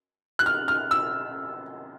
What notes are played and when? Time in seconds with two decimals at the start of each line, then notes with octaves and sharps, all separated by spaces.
0.39 F#6
0.46 F6
0.68 F6
0.91 E6